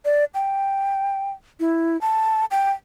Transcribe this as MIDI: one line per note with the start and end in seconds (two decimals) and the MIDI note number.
0.05 0.25 74
0.35 1.31 79
1.60 2.00 64
2.01 2.45 81
2.51 2.72 79